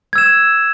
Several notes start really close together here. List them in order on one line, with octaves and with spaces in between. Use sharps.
G#6 E6 E7